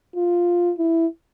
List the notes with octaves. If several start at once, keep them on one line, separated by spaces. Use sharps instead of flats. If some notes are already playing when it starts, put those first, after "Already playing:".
F4
E4